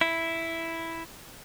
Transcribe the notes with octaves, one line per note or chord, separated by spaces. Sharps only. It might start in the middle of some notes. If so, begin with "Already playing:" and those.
E4